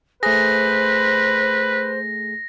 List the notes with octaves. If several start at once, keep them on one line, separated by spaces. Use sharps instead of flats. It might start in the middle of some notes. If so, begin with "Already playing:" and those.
A3 G#4 B4 C5 A#6